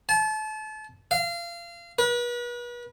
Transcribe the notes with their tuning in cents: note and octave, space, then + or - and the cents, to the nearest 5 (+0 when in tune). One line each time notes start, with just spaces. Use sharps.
A5 -30
F5 -25
B4 -40